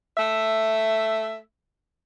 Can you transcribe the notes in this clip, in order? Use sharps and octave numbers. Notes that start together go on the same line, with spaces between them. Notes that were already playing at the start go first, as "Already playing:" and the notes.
A3 E5